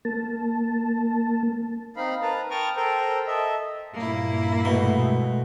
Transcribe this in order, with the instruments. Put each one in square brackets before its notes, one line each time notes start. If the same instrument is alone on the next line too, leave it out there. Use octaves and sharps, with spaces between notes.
[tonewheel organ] A#3 A5
[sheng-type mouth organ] C4 D#4 F5 B5
A#4 B4 A5 A#5
G5 A5 A#5 C#6 D#6 F6
A4 A#4 C5 G5 A#5
A4 D#5 E5
[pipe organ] G2 A#2 [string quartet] A#3 E4
[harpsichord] B2 [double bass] G#3 A3